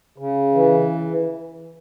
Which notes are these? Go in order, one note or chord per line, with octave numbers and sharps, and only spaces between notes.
C#3
E3